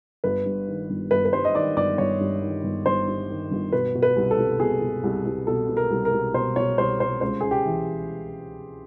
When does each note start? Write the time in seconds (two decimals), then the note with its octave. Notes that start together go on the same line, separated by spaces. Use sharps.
0.24 G1 B4
0.46 G2
0.68 D#3
0.90 G1
1.11 G1 B4
1.25 B4
1.33 G2 C5
1.45 D#5
1.55 D#3 D5
1.76 G1 D5
1.98 G1 C#5
2.20 G2
2.42 D#3
2.64 G1
2.86 G1 C5
3.07 G2
3.29 D#3
3.51 G1
3.72 B2 B4
3.95 B2
4.03 B4
4.16 C2
4.31 A4
4.39 C2
4.60 B2 G#4
4.82 B2
5.04 C2
5.25 C2
5.47 B2 A4
5.69 B2
5.77 A#4
5.91 C2
6.05 A#4
6.13 C2
6.34 B2 C5
6.56 B2 C#5
6.78 C2 C5
7.00 C2 C5
7.21 C#2 C5
7.41 C#3 G#4
7.51 G4
7.66 E3